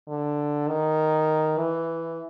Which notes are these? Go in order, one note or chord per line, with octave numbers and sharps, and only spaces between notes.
D3
D#3
E3